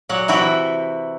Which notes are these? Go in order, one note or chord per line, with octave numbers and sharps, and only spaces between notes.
A#2 F#3 F#5
C3 E3 E4 F#4 G5